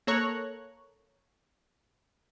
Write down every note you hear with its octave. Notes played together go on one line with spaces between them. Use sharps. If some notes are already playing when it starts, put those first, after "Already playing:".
A#3 A4 C#5 A#5 C#6 F#6